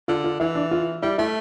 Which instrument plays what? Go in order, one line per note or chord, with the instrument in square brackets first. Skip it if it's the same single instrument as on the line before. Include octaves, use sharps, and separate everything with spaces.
[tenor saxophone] D3 [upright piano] F4
[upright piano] F4
[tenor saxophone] E3 [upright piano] E4
[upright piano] D4
F4
[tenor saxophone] G3 [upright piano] E4
[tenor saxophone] A3 [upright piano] E4